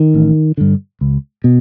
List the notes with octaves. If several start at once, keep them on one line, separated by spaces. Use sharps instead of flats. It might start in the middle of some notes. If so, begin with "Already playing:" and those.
Already playing: D#3
A1
G2 D3
C#2
B2